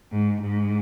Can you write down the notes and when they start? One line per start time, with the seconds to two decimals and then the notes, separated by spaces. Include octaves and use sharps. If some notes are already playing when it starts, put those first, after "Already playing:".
0.11 G#2
0.42 G#2